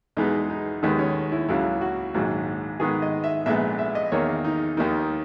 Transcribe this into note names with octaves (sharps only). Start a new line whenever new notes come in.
E2 B2 G#3 B3 D#4
D#4
D#2 D#3 G#3 B3 D#4
C#4
E4
C#2 C#3 F#3 E4
F#4
A#1 G#2 D#3 F#3
G#2 D#3 G#3 B3 G#4
D#5
E5
A#1 A#2 G#3 B3 E5
E5
D#5
E2 D#3 A#3 C#5
D#4
D#2 D#3 A#3 D#4